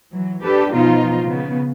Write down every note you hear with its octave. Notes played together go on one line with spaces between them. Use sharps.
E3 F#3
D4 G4 A4 B4
B2 F3 B3 D#4 F4
C#3 B3